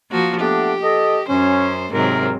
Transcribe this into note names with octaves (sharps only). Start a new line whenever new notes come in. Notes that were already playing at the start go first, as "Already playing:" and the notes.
F3 A#3 F#4
A3 B3 D4 G4
A4 D#5
F#2 C#4 C5
D#2 G#2 C3 F#3 C4 A#4